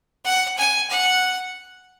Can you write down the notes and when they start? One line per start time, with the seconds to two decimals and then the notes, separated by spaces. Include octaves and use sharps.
0.25 F#5
0.58 G#5
0.90 F#5